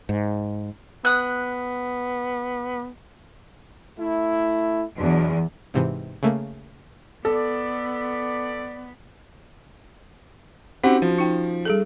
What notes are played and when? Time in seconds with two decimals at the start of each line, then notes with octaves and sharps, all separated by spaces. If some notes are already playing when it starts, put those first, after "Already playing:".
0.09 G#2
1.05 B3 D#6 F#6
3.99 A3 E4
4.97 E2 B2 F#3 D4
5.74 G#2 C3 E3
6.23 C#3 A3 A#3
7.25 B3 A4 D5
10.84 C4 C#4 D#4 F#4 G4 F#5
11.02 F3 F#4
11.18 D#4 G5
11.65 G3 G#4 A4